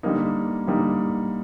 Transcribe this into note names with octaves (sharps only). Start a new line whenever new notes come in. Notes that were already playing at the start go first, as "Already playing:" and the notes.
D3 G3 A#3 D#4
D3 G3 A#3 D#4